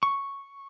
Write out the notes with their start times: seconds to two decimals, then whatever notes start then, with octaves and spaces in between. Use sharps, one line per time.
0.03 C#6